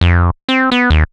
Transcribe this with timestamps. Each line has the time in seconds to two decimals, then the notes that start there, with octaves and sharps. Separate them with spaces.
0.01 F2
0.49 C4
0.72 B3
0.90 D#2